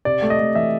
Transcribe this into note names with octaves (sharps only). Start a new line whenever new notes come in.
C3 D5
A3
D#5
A3
E3 E5